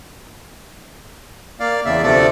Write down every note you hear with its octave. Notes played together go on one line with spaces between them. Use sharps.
A#3 D5 F5
E2 C#3 D5 E5
D2 C3 F3 A3 A4 D5